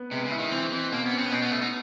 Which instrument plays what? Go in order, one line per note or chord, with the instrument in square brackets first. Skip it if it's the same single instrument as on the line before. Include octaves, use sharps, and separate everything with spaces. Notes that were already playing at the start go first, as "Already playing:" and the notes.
Already playing: [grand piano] B3
[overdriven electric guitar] C3 [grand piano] G#3
[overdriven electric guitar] C#3
[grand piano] E4
[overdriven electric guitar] D#3
[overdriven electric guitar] E3 [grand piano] C4
[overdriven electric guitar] E3 [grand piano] C4
[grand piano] B2 [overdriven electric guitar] A#3
[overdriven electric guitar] B3
[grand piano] C#4
[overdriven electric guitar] C4
B3
[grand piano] B2 [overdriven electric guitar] C4
[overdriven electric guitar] B3
[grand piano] B2 [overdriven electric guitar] A3
[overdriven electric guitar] D#4